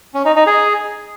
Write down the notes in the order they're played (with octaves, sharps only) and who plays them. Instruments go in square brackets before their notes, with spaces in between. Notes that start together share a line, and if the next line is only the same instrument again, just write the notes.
[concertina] C#4
D#4
D#4
G#4